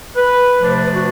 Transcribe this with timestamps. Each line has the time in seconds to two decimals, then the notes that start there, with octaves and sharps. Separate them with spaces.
0.15 B4
0.60 C3 F3 A3 D4 B4
0.71 C5
0.82 B4
0.93 F#4